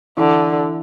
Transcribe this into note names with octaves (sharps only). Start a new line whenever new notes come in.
D3 E3